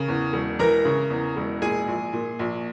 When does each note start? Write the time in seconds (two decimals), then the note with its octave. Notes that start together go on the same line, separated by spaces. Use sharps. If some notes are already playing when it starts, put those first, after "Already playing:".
Already playing: C#3 A#4
0.08 E2
0.33 E1
0.59 E3 A#4 A#5
0.85 C#3
1.10 E2
1.37 E1
1.62 A#2 G#4 G#5
1.87 A#1
2.13 A#2
2.39 A#1